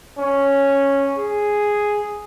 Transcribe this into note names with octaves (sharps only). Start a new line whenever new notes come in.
C#4
G#4